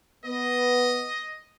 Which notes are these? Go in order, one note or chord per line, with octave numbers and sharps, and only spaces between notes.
B3 D#5